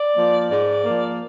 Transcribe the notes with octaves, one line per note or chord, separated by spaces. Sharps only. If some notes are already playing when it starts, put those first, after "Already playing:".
Already playing: D5
F3 A#3
G#2 D5
F3 A#3